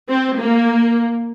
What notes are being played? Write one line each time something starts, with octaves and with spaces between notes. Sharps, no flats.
C4
A#3